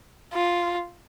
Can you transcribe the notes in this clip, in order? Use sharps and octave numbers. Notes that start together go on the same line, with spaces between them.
F4